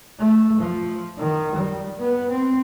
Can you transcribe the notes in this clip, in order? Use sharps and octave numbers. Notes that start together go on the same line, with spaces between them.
A3
F3
D#3
G3
B3
C4